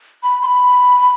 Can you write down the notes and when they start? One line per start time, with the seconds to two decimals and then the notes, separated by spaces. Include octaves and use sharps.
0.23 B5
0.43 C6
0.46 B5